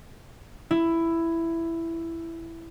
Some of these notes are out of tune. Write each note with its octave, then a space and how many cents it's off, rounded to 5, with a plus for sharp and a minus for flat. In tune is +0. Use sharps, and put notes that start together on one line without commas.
E4 +10